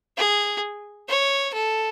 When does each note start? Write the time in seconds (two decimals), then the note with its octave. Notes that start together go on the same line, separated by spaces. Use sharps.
0.17 G#4
1.08 C#5
1.53 A4